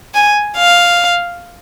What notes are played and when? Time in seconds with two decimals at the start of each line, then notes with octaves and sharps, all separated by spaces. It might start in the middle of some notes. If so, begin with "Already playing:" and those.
0.15 G#5
0.57 F5